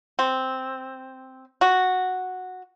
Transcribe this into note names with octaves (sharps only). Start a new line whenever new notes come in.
C4
F#4